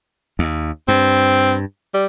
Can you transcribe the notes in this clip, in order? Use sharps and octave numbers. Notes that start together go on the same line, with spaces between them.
D#2
G2 C4
G3